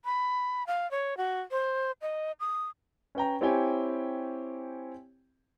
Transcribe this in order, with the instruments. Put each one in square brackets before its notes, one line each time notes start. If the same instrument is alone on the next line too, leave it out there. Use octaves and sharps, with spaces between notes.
[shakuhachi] B5
F5
C#5
F#4
C5
D#5
D#6
[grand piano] C#4 B4 G5 A#5
C4 E4 G4 C#5 G5 G#5